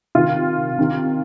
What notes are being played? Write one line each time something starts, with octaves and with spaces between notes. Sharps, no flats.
C3 D#3 F4
C3 D#3